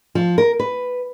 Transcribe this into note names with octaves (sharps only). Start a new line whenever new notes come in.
F3
A#4
B4